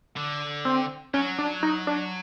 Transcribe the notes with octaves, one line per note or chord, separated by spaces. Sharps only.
D3
C4
F#3 C#4
D4
D#4
D4